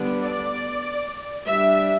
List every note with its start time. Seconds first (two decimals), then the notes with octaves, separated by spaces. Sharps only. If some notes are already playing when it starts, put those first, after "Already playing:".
Already playing: D3 G3 B3 D4
0.22 D5
1.46 G3 D4 E5